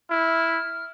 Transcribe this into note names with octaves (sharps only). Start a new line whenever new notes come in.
E4 F6